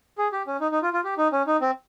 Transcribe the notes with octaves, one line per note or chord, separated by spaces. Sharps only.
G#4
G4
C#4
D#4
D#4
F4
F4
G4
D#4
C#4
D#4
C4